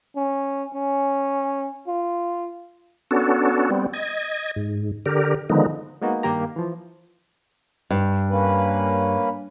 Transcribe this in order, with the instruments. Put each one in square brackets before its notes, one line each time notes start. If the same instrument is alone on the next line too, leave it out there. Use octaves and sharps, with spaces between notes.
[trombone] C#4
C#4
F4
[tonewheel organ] B3 C#4 D4 F#4 A4
G3 B3 C4
D#5 G#6
G#2
D3 G4 A#4
D3 D#3 F3 G#3 B3 D#4
[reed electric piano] G#3 A#3 B3 D#4 F#4
G2 D#3 A#3 G4 A#5
E3 F3
[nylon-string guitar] G2
[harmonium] A#3 C#4 B4